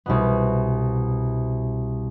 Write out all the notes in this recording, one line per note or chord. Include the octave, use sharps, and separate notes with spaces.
C2 B2 B3